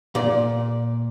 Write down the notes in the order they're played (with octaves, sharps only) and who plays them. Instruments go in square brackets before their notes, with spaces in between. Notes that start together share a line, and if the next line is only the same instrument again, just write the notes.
[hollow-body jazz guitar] A#2 D5